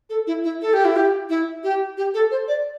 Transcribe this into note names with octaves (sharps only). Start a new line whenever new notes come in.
A4
E4
E4
A4
G4
E4
G4
E4
G4
G4
A4
C5
D5